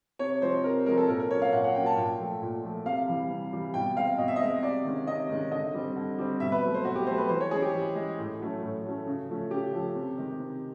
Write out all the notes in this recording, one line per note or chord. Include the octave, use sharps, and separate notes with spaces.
C3 C#5
F3 G#3 C4 C5
C3 A#4
F3 G#3 C4 A#4
A4
A#2 A#4
A#4
F#3 A#3 C#4 C#5
F5
A#2 F#5
F#5
F#3 A#3 C#4 G5
A5
A#2 G5
F3 A3
A#2
F3 A3
C3 F5
E3 G3
C3
E3 G3
B2 G5
G#3 C4 F5
B2 D#5
E5
D#5
G#3 C4
C3 D5
D#3 G#3 C#4
C3 D#5
D#3 G#3 C#4
D3 D#5
G3 C4
D3
G3 C4
B2 E5
B4
F#3 A3
C5
B2 F#4
G4
F#3 A3 C5
B4
E3 C5
C#5
G#3 C#4 G#4
G4
E3
G#3 C#4
A2
F#3 A3 C#4
A2
F#3 A3 C#4
C#3
F3 A3 C#4
C#3 G4
F3 A3 C#4
C3
D#3 G#3
C3